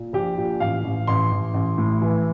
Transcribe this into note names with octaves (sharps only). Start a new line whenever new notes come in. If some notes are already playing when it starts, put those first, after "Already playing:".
Already playing: A#2
A#1 G4
A#2
A1 F5
A1
A1 C6
A1
A1
A2
E3